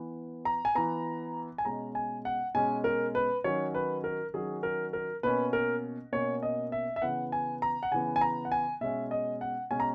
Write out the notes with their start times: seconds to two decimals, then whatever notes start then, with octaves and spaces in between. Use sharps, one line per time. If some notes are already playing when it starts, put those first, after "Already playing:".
Already playing: E3 B3
0.45 A#5
0.65 G#5
0.75 E3 B3 A#5
1.58 G#5
1.65 B2 G#3 C#4 A#5
1.95 G#5
2.25 F#5
2.55 B2 G#3 C#4 G#5
2.84 A#4
3.15 B4
3.44 D#3 F#3 C#4 C#5
3.75 B4
4.04 A#4
4.34 D#3 F#3 C#4 G#4
4.63 A#4
4.93 A#4
5.23 B2 A#3 C#4 B4
5.53 A#4
6.12 B2 A#3 C#4 C#5
6.43 D#5
6.72 E5
6.96 E5
7.02 C#3 E3 B3 F#5
7.32 G#5
7.62 A#5
7.83 F#5
7.91 C#3 E3 B3 G#5
8.16 G#5
8.21 A#5
8.45 F#5
8.52 G#5
8.81 B2 G#3 C#4 E5
9.11 D#5
9.41 F#5
9.71 B2 G#3 C#4 G#5
9.80 A#5